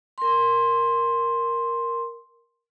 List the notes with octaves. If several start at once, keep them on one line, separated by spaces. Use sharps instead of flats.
A#4 C6